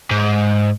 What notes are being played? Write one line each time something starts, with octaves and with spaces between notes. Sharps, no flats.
G#2